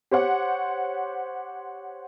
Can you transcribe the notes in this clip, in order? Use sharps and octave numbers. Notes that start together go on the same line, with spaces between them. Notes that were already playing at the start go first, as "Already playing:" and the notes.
G4 C5 C#5 F#5